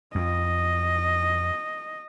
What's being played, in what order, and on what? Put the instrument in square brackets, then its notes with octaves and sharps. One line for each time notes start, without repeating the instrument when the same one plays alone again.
[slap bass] F2 [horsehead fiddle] D#5